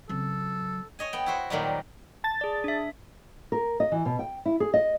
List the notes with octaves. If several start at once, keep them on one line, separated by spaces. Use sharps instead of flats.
C#3 F#3 C4 A4
C#5 D#5 G#5
B3 G5
E4 F#4 C5
A#2 D#3 F#3 G3
A5 A6
G#4 D5
D4 E5
A#4
D#5
E3
B2
G5
E4
G#4
D#5